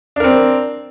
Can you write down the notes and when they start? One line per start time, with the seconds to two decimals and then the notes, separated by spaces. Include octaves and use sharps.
0.16 D4
0.20 A#4
0.24 C4